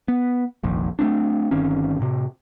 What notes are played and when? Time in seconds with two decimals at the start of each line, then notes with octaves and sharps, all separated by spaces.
0.08 B3
0.63 F1 A#1 D#2
0.99 A3 A#3 C4 D4
1.51 G1 D#3 C4 C#4
1.99 A2 C3